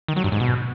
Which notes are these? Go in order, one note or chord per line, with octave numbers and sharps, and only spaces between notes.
D#3
F#3
G2
G#2
B2